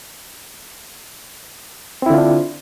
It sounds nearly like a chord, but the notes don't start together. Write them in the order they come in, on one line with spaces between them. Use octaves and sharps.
C4 E4 D3 F4 D4